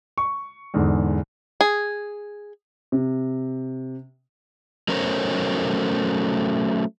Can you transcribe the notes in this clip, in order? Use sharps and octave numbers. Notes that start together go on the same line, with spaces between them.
C#6
E2 G#2 D3
G#4
C3
F#3 A3 C#4 A#4 C5 C#5